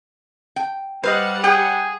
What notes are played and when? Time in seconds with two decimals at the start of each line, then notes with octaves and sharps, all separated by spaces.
0.56 G5
1.03 G3 B4 C5 D#5 F5 F#5
1.44 G#4 G5